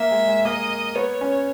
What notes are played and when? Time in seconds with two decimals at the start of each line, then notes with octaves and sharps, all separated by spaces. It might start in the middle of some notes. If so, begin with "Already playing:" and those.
Already playing: A#3 E5
0.11 G#3
0.27 G#3
0.45 A#3 D#5
0.95 B3 C#5
1.21 C#4